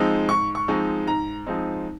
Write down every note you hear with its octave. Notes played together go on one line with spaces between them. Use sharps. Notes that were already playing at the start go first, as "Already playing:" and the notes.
Already playing: F3 G#3 C4 D#4
G#2 C#6
C#6
F3 G#3 C4 D#4
G#2 A#5
F3 G#3 C4 D#4